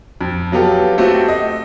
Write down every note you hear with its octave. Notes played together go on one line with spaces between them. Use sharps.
F2
F#3 B3 F4 G4 A4
A3 C4 F#4 G4
D#5